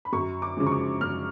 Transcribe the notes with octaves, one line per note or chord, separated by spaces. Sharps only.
B5
F#2 C#6
D6
C#3 F3 G#3
C#6
D6
F#2 F6